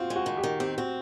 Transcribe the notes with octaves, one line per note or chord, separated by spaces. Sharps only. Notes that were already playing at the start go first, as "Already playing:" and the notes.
Already playing: C4 F4 F#4
G#3
F#4
D#3
G4
D#3
C4 G4
C4 F#4